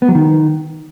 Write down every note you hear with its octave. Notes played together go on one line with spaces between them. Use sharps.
B3
F#3
D#3